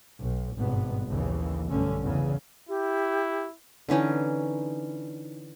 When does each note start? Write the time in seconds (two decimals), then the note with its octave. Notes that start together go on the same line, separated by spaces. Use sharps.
0.22 B1
0.59 G#1 G2 B2 B3
1.09 A#1 D#2 C#3 E3
1.70 B1 G2 D3 A3 C#4
2.03 E2 C#3
2.69 E4 G4
3.89 D3 E3 C#4 D#4